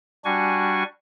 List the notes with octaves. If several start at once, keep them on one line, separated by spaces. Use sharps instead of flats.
G3 D4 F#4 G#5 C#6